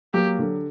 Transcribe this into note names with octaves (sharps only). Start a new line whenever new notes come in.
F#3 A#3 G4
D3 F#3